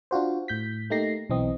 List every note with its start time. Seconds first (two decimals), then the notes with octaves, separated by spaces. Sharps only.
0.11 D4 F4 F#4 C5
0.48 A2 G6 B6
0.90 A3 A#3 D#4 G4 A#6 C7
1.30 B1 E3 C4 D#5